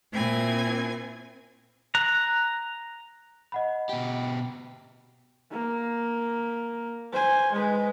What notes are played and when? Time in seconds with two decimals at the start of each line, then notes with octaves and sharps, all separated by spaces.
0.13 A#2 C4 E4 G#5 G#6
1.95 A#5 F#6
3.52 D#5 F#5 B5
3.89 B2 G4
5.52 A#3
7.13 C5 G#5
7.53 G#3 B4